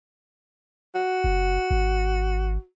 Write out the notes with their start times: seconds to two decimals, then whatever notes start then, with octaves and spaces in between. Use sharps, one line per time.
0.95 F#4
1.24 F#1
1.71 G#1